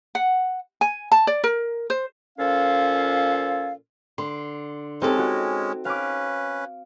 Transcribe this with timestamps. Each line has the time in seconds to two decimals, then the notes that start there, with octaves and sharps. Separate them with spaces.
0.15 F#5
0.81 G#5
1.12 A5
1.27 D5
1.44 A#4
1.90 C5
2.39 A#2 F3 C#4 A4 F5
4.18 D3 C6
5.02 G#3 C4 C#4 D#4 G4 A4
5.19 F#4
5.85 C#4 B4 F5 D6